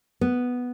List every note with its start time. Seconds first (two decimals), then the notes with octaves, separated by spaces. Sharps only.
0.21 B3